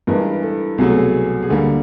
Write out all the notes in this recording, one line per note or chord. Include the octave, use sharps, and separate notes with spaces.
G2 E3 G#3 A#4
A4
C2 B2 F#3 A3 G#4
A4
G#4
G#4
D2 D3 G3 A#3 A4